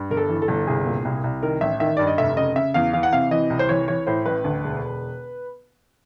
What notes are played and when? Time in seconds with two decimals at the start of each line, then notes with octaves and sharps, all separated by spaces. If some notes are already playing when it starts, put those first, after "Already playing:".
Already playing: G2
0.11 G1 A#4
0.17 A4
0.29 E3
0.42 A4
0.48 G1
0.67 C2 G#4
0.86 A#2
1.05 C2
1.24 C2
1.42 D#3 A#4
1.61 A1 E5
1.80 D#3 E5
1.97 G2 D5
2.07 D#5
2.18 F1 E5
2.37 C#3 D#5
2.56 C#3 E5
2.74 E2 F5
2.93 E3 F5
3.03 F#5
3.12 C3 F5
3.31 E3 D#5
3.50 C2
3.59 C5
3.69 E3 C#5
3.88 E3 C#5
4.07 A2 C5
4.26 A1 B4
4.44 D2
4.64 E1